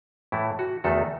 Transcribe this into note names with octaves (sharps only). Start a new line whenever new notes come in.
A2 E3 A3 E4
F#4
E2 D#3 A3 D#4 F#4 A4